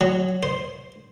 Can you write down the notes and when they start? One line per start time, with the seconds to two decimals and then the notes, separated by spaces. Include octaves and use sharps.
0.01 F#3
0.43 C5